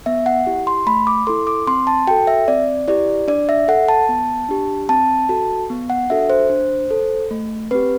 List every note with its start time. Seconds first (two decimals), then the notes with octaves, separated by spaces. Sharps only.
0.06 B3 E5
0.26 F#5
0.47 E4 G4
0.67 C6
0.86 A3 B5
1.07 D6
1.27 E4 A4 C6
1.47 D6
1.67 C4 C6
1.87 A5
2.07 F#4 A4 G5
2.27 E5
2.48 C4 D5
2.88 E4 G4 D5
3.28 D4 D5
3.49 E5
3.68 A4 F#5
3.88 A5
4.09 B3
4.49 D4 G4
4.89 C4 A5
5.29 F#4 A4
5.70 B3
5.90 F#5
6.10 D4 F#4 A4 E5
6.30 C5
6.50 D4
6.91 A4
7.31 A3
7.71 C4 G4 B4